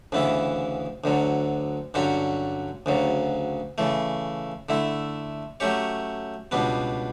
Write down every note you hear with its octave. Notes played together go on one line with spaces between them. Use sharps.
D2 C#3 E3 B3 E4
D2 D3 F#3
G2 D3 F#3 C#4 F#4
D2 C#3 F#3
C#3 E3 A3
D3 A3 E4
F#3 A3 C#4 G4 C#5
C#2 B2 G3 B3 D4